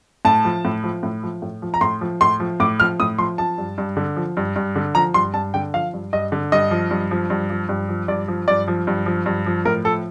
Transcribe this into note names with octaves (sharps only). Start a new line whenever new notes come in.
A2 A5
F3
A2
F3
A2
F3
A2
F3
A#5
A2 C6
F3
A2 C6
F3
A2 D6
F3 F6
A2 D#6
F3 C6
F3 A5
G2
G2
D3
F3
G2
G2
D3
F3 A#5
G2 C6
G2 A5
D3 G5
F3 F5
G2
G2 D#5
D3
G2 D#5
F3
G2
F3
G2
F3
G2
F3
G2 D5
F3
G2 D5
F3
G2
F3
G2
F3
A2 A#4
F3 A4